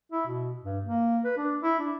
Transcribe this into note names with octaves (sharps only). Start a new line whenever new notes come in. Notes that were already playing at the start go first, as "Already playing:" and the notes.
E4
B2
G2
A#3
B4
D4
E4
D4